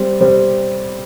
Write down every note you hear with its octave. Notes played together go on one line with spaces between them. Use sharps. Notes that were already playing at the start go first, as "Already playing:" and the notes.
Already playing: G3 C4
G3 C4